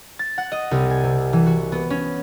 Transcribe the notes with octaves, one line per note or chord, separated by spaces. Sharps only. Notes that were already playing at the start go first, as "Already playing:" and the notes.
A6
F#5
D#5
C2
G#5
C3
E3
F#4
B3
C#4